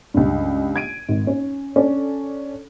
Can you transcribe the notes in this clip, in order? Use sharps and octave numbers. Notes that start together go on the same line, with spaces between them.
C#2 G2
G#6 D7 D#7
G#1
C#4
C#4 D4 A4 D5